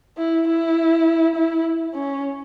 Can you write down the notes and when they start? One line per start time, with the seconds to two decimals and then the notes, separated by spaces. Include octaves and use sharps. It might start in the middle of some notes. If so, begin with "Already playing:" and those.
0.18 E4
0.47 E4
1.35 E4
1.95 C#4